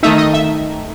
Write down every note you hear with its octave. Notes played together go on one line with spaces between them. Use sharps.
D#3 A3 D#4 E5
D#5
E5